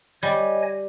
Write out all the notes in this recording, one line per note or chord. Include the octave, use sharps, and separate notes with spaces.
G3 C#5 D#5 G#5